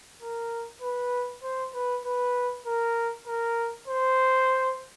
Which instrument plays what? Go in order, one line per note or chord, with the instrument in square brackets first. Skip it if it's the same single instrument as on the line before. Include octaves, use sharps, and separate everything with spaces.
[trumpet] A#4
B4
C5
B4
B4
A#4
A#4
C5